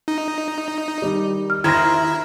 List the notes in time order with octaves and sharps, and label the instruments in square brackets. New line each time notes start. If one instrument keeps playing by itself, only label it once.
[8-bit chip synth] D#4
[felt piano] D#3 G3
[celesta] F6
[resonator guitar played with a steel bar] D#3 C5 [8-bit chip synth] E4 [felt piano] G#6 A#6